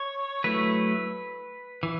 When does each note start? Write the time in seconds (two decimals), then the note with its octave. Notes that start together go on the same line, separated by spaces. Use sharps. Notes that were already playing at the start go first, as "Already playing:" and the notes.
Already playing: C#5
0.44 F#3 A3 E4 B4
1.83 E3